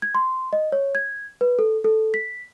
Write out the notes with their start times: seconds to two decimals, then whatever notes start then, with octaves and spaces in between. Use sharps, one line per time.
0.02 G#6
0.15 C6
0.53 D#5
0.72 C#5
0.95 G#6
1.41 B4
1.59 A4
1.84 A4
2.14 B6